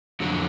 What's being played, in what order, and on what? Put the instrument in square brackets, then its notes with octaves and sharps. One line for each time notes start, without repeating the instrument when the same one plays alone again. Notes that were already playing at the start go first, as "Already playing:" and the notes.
[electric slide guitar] F2 D3 F#3